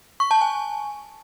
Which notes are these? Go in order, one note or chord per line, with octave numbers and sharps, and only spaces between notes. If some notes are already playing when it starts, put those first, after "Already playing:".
C#6
A5
G#5